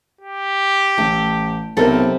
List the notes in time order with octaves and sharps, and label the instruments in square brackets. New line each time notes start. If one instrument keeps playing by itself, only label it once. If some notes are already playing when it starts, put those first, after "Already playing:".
[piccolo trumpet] G4
[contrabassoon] A1 [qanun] A3
[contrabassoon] B1 [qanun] C3 B5 [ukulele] A4 A#4 C5